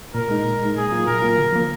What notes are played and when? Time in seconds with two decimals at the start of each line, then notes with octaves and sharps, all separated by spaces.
0.14 A#2 A#4
0.29 G#3 D#4
0.45 A#2
0.60 G#3 D#4
0.76 A#2 G#4
0.91 F#3 A#3 F4
1.07 A#2 A#4
1.22 F#3 A#3 F4
1.37 D3
1.53 F3 A#3